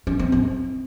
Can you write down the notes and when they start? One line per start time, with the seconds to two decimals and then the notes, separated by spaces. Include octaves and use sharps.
0.07 C#4
0.19 C4
0.32 C4